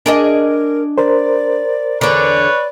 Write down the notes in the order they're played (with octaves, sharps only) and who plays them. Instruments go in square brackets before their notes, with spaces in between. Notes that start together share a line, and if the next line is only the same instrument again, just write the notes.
[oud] D4 G#4 D#5 [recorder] A#4
[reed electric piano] A#4 C5 [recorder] D5
[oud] E2 D3 [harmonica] B4 C#5 [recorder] D5